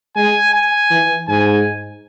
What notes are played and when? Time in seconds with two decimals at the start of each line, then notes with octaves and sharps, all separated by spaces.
0.16 G#3 G#5
0.53 G#5
0.91 E3
1.28 G#2 G#5